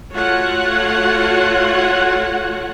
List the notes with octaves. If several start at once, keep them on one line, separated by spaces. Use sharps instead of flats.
A3 F4 F#4 C#5 F#5